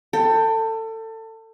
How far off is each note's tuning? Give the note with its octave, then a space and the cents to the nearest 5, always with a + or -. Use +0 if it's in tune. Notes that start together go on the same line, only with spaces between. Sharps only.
A4 +25 G5 +0